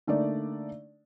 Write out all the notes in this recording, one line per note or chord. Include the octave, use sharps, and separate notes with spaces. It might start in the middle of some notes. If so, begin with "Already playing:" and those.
D3 A3 A#3 D#4 D5